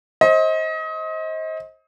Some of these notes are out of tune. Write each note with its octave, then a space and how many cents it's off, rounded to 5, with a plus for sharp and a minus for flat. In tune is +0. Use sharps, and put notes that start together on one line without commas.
C5 +30 D#5 +30